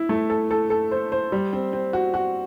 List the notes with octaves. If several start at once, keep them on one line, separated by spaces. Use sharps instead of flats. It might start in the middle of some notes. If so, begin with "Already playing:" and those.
Already playing: E4
A3
A4
A4
A4
C5
C5
G3
C4
C4
F#4
F#4